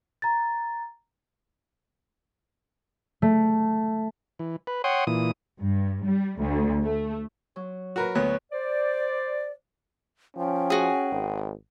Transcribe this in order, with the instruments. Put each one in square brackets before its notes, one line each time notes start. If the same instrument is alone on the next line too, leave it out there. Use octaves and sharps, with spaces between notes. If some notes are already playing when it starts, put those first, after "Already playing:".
[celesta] A#5 A6
[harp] A3
[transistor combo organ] E3
B4
C#5 F#5 G5 C6 D#6
A#2 E3 D#6
[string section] G2
G3
D2
A3
[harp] F#3
[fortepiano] F#4 A#4 B4
[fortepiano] D2 B3 F#6 [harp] C#5
[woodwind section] C5 D5
[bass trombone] F3 [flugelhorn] C#4 [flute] G5
[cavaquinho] F#4 G#4
[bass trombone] G#1